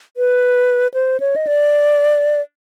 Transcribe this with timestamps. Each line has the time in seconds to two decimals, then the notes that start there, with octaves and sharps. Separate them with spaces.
0.17 B4
0.94 C5
1.20 C#5
1.36 D#5
1.47 D5